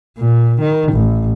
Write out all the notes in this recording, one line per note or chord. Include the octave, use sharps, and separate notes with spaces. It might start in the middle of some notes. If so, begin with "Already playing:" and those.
A#2
D#3
A1